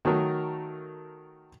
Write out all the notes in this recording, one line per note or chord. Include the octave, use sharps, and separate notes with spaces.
D#3 F#3 A3 A#4